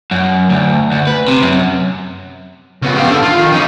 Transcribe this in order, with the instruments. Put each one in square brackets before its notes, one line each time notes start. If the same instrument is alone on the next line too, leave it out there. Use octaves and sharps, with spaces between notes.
[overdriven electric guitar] F#2
D2
D2
B4
C3
F#2
[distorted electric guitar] C#3 B3
G4 F5
D4 A4
F4
D#3
C#4 D#4